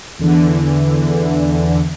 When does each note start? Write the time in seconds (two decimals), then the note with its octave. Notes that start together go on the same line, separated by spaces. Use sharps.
0.19 E2 D3 E3